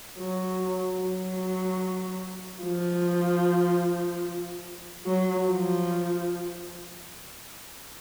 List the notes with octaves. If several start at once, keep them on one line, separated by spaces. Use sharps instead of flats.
F#3
F#3
F3
F#3
F3